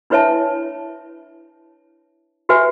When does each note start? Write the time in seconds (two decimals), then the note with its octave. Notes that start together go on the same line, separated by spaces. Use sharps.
0.10 D4 E4 B4 C#5 E5 A5
2.49 F#4 G4 B4 E5 G#5